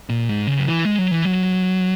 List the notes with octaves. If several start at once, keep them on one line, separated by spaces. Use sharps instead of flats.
A#2
G#2
C#3
F#3
E3
G#3
F#3
E3
F#3